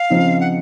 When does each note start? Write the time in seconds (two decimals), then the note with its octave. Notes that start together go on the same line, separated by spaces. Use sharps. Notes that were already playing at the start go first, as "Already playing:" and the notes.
Already playing: F5
0.10 C#3 F3 C4 D#4
0.41 F#5